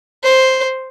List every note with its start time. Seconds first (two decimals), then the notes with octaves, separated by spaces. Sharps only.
0.24 C5